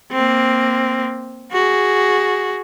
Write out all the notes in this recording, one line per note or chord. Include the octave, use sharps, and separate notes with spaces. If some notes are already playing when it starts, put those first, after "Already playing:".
A#3 C4
F#4 G#4